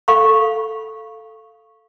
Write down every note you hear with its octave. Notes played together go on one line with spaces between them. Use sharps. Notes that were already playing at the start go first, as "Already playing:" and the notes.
A4 F5 B5 C#6